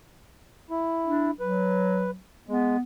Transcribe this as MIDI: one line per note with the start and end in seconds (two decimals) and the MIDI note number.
0.70 1.31 64
1.07 1.31 62
1.40 2.17 54
1.40 2.11 71
2.49 2.77 56
2.49 2.82 59